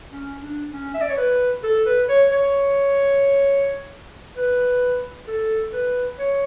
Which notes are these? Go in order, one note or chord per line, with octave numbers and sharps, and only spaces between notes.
C#4
D4
C#4
E5
D5
C#5
B4
A4
B4
C#5
C#5
B4
A4
B4
C#5